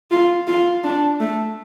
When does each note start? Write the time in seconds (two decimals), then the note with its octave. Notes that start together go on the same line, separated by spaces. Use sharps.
0.11 F4
0.47 F4
0.84 D4
1.20 A3